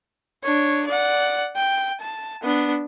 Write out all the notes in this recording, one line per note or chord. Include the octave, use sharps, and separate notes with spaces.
D4 C#5
D5 F#5
G5
A5
B3 D4